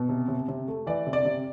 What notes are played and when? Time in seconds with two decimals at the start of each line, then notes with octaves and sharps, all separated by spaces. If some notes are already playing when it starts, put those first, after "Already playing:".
Already playing: B2
0.09 C3
0.28 C3
0.48 C3
0.68 A3
0.87 E3 D5
1.06 C3
1.13 D5
1.25 C3